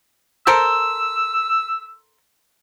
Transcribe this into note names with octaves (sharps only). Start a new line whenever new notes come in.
A4 A#4 C5 E6